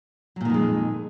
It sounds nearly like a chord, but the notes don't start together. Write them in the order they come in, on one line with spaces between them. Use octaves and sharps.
F#3 A#2 D#3 F2 G#3